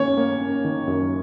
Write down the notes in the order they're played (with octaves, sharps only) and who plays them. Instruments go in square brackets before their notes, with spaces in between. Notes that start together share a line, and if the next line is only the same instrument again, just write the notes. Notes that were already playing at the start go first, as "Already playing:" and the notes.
Already playing: [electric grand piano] D#3 A#3 C#4 [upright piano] C#5
[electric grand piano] A#3
C#4
D#3
F#2